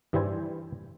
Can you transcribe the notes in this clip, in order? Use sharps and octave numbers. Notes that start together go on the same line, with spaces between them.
G2 E3 G3 E4 C5 G#5